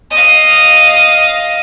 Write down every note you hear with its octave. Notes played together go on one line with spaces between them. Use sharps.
D#5 F5